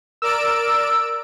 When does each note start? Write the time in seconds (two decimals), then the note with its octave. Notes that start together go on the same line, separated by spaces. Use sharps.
0.22 A#4 D5 E6 D7